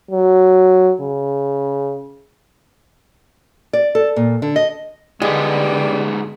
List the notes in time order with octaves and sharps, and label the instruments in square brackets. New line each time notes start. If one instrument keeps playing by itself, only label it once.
[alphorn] F#3
C#3
[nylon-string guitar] D5
A4
A#2
D3
D#5
[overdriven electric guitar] G#2 B3 [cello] D3 [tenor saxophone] G3 [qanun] G#3